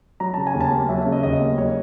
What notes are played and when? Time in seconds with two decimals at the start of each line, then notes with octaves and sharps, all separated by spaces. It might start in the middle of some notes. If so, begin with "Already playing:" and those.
0.20 F#3 A#5
0.34 C#3 A5
0.47 G#5
0.54 D#2
0.61 A5
0.72 A#3
0.89 F#3 E5
1.01 C#3 E5
1.12 D#5
1.23 D#2 D#5
1.41 A#3
1.58 F#3 C#5